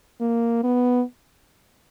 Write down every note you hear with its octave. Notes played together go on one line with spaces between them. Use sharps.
A#3
B3